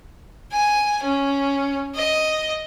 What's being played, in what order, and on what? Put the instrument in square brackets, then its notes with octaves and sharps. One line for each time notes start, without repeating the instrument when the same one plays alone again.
[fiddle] G#5
C#4
D#5